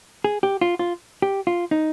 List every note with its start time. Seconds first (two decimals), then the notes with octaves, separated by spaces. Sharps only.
0.24 G#4
0.43 G4
0.61 F4
0.79 F4
1.22 G4
1.47 F4
1.71 D#4